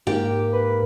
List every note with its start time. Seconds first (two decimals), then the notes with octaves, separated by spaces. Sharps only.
0.07 G#2 A#3 G4
0.53 B4